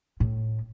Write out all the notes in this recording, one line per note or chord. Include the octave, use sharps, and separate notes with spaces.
A2